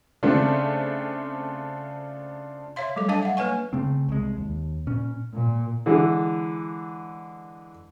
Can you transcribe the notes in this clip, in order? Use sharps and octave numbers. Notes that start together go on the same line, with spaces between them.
C#3 A3 C4 D4 F4
C#5 E5 F5 C6
F#3 G3 A3 A4
D4 A4 D#5 F5 A5
E5 F#5
A#3 B4 C#5 G#5 C#6
C#3 A3 C4
C2 G#3
D#2
A#2 C#4
A#2
D3 E3 G#3